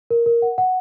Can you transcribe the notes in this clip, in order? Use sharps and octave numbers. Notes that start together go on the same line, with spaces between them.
A#4
A#4
F#5
F#5